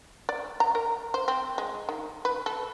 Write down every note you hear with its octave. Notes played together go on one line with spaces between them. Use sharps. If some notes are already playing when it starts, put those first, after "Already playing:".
D5
A#5
A#4
C5
C4
G#3
D#3
B4
A4